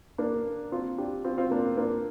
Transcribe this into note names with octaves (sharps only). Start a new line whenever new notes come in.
A#3 D4
C4 F4
D4 G4
C4 F4
C4 F4
A#3 D4
A#3 D4